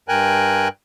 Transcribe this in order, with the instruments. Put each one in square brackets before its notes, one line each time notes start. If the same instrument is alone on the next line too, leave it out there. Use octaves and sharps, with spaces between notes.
[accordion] G2 A#4 G5 G#5 F#6